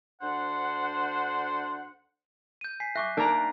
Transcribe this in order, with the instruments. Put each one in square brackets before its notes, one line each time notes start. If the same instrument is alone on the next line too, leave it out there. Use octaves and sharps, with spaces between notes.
[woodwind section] D2 D4 C5 F#5
[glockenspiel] G6 D#7
G#5 B6 C7
[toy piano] E5 C#6 D6 [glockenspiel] F#6
[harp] A#3 D4 A#5 [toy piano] D#4 A#4 D5